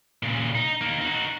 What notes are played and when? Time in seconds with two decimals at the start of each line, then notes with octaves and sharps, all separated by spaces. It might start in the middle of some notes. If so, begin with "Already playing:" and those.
0.23 A#2 C#3
0.55 D#4
0.81 A#3 D#4
1.01 D#4 F#4